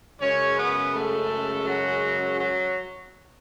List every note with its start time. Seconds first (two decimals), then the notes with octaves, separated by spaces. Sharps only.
0.21 F#2 C#3 G#3 C#4 C#5
0.57 B3 B4
0.94 A3 A4
1.67 F#3 F#4
2.40 F#3 F#4